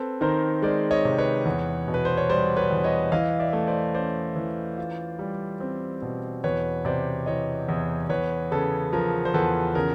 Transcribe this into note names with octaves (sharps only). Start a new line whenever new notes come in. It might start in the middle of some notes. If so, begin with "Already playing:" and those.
Already playing: C4 A4 B4
D#3 A#4 C5
G#3 C5 D5
C#5 D#5
C3
B4 C#5
E2
B2
B4
C5
C#5
G3 C5 D5
B4 C#5
E2
C#5 D#5
E3 D#5 F5
D5 E5
A3
C5 D5
C#4 C5 D5
E3
F4
G3
C4
B2
E2 B4 C#5
C3 C5 D5
E3 C#5 D#5
E2
E2 B4 C#5
C#3 A4 B4
F3 A#4
C5
E2 A4 B4
C#3 A#4